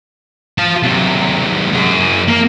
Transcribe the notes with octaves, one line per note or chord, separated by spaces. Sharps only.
F4 A5
C3 F#3
F#2 G#4
A#3